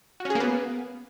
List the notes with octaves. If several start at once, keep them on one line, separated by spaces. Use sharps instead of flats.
F#4
C#4
G#4
A#3
B3